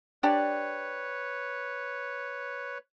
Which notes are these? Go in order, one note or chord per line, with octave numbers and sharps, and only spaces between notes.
D4 G4 B4 C#5 D5